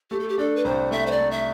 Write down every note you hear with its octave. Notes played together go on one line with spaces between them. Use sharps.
A3 G4
A4
G4
D4 A4
B4
C2 C5
A3 E5
C5
D5
A3
E5